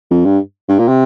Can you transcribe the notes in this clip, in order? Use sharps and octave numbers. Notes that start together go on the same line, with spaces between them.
F2
G2
G2
A#2
C3